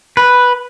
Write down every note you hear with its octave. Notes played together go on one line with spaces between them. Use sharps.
B4